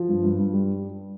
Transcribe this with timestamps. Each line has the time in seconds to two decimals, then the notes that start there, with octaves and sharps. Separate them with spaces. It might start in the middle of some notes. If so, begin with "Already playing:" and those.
Already playing: F3
0.09 G2
0.23 G2
0.38 G2
0.53 G3